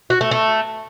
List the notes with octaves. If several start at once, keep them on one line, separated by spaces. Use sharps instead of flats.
F#4
A3
A3